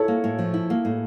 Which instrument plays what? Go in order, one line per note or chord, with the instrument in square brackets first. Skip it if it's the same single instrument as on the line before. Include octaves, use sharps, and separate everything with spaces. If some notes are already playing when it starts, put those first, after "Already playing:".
Already playing: [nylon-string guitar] E4 [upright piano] A4 C#5
[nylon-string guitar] A#3
A2
F3
E4
A#3
A2